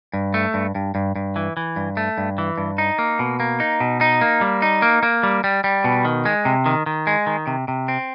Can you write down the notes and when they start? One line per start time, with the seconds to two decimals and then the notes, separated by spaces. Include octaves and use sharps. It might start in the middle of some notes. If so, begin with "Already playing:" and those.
0.13 G2
0.34 A3
0.54 G2
0.75 G2
0.95 G2
1.16 G2
1.36 E3
1.57 E3
1.76 G2
1.97 A3
2.18 G2
2.38 E3
2.58 G2
2.78 D#4
2.99 A#3
3.19 B2
3.40 A#3
3.60 D#4
3.80 B2
4.01 D#4
4.21 A#3
4.41 G3
4.62 D#4
4.82 A#3
5.03 A#3
5.23 G3
5.44 G3
5.64 G3
5.84 B2
6.05 D#3
6.25 G#3
6.45 C3
6.66 D#3
6.86 D#3
7.07 G#3
7.27 D#3
7.47 C3
7.68 C3
7.88 C4